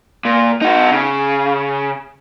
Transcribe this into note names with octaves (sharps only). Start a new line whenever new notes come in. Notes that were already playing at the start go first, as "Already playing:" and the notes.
A#2
D#4 F#4
C#3